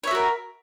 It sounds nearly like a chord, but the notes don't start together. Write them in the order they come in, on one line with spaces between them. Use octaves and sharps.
C#5 E5 F#4 A#4